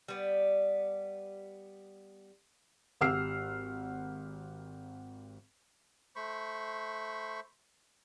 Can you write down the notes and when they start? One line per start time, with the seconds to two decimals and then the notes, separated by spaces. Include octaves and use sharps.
0.08 G3 B3
3.01 G#1 G4 F#5 E6 F6 C7
6.16 A3 C5 B5 C#6